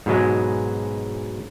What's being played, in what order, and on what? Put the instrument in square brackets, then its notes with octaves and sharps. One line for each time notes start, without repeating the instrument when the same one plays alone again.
[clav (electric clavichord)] G#2 B2 F#3 G#3